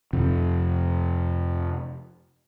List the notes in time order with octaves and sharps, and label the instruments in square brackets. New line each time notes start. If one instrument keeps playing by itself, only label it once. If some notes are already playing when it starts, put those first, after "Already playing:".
[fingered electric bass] F2 C3 F3